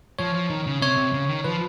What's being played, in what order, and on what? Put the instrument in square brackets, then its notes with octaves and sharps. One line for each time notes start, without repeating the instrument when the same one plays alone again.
[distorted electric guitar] F3 [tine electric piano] C#5
[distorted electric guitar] F3
D#3
C#3
[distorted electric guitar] C3 [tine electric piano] C#5
[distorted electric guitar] C3
C#3
D#3
[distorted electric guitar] F3 [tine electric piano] B4